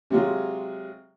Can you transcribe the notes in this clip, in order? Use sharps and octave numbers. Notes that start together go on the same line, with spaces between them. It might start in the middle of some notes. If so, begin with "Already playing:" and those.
C3 F#3 G#3 F4